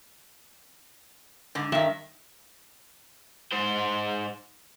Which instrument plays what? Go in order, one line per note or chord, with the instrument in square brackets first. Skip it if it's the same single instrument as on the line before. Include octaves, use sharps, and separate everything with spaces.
[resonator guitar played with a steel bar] G#2 D3
[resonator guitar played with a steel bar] G2 D#3 [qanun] E5
[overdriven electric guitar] G#2 C5